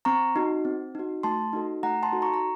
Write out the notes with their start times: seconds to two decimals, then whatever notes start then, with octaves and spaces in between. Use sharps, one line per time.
0.05 C4 A#5 C#6
0.36 D#4 F#4
0.65 C4
0.95 D#4 F#4
1.23 A3 A5 C6
1.53 D#4 F#4 A4
1.83 A3 F#5 A#5
2.03 A5 C6
2.12 D#4 F#4 A4
2.22 A#5 C#6
2.34 A#5